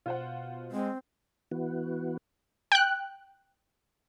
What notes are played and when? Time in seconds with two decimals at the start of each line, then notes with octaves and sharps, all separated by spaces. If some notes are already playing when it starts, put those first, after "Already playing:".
0.06 B2 F4 C5 F#5
0.72 G#3 C4
1.51 E3 B3 F#4
2.72 G5 F#6